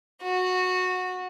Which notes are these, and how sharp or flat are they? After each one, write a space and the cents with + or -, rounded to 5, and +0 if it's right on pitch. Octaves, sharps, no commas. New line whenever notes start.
F#4 -15